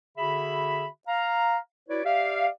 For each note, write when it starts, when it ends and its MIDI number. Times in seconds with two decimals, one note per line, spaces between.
0.18 0.86 50
0.18 0.86 66
0.18 0.86 68
0.18 0.86 76
0.18 0.86 83
1.08 1.57 77
1.08 1.57 82
1.89 2.01 64
1.89 2.01 66
1.89 2.01 71
1.89 2.01 73
1.89 2.01 74
2.05 2.47 67
2.05 2.47 74
2.05 2.47 76
2.05 2.47 77